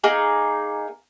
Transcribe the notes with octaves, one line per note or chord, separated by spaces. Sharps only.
A#3 D#4 G#4